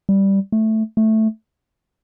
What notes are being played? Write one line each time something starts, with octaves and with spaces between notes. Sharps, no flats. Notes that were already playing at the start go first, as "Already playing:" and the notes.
G3
A3
A3